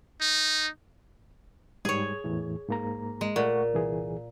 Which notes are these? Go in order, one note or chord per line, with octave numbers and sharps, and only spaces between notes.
D#4
G#2 G3 G#4 C#5
E2 A2 E3
G#2 A#3 A#5
G#3
A#2 A3 F#5 C#6
C2 E3 G#4